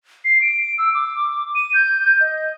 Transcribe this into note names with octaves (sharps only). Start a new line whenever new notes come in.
C7
D7
E6
D6
D#7
G6
D#5